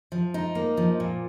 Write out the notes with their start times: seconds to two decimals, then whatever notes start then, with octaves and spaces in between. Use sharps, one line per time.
0.12 F3
0.34 D#4
0.55 A#3
0.77 F3
1.00 A#2